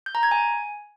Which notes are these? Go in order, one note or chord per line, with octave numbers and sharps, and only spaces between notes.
G6
A#5
G#6
G#5